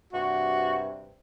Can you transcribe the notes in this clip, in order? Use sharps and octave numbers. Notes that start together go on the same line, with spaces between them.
G2 C3 F#4